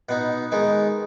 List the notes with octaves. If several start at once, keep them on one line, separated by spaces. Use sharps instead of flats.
B2 B3 D#4 F#5
D#3 G#3 B3 D#4